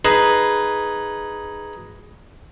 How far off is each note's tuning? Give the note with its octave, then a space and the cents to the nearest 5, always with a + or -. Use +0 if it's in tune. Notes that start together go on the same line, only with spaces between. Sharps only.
D#4 +5 G#4 +0 B4 +0